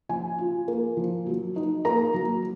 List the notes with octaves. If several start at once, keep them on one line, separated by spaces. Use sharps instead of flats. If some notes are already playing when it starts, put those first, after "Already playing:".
F3 G#5
F4
A#3
F3
F#3
D#4
A#3 A#5
F#3